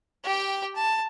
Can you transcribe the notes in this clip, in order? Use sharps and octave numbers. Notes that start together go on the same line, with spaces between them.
G4 G5
A5